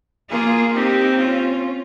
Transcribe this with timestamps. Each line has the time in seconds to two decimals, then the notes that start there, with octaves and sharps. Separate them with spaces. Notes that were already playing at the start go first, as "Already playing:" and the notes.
0.31 A#3 F4 G#4
0.75 C4 D#4 G4
1.19 C#4 F4